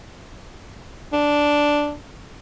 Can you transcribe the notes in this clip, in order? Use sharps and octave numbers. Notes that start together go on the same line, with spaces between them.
D4